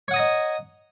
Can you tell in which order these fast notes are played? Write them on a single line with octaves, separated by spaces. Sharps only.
C#5 F#5 D#6 A#5 D#5